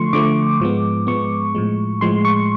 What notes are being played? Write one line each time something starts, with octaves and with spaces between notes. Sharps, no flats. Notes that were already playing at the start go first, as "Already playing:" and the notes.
Already playing: D3 F3 A3 C6 C#6
D3 F3 A3 D6
G#2 F3 G#3 B3
G#2 F3 G#3 B3 C#6
A2 F3 G#3
A2 F3 G#3 C6
C#6